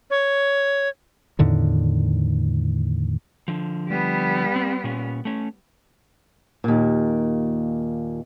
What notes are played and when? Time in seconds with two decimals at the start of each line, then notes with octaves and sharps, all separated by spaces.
0.10 C#5
1.39 E2 A2 D3 D#3
3.48 D3 F3
3.89 G3 B3
4.56 C4
4.84 A#2 C#4
5.25 A3 C#4
6.64 D#2 A#2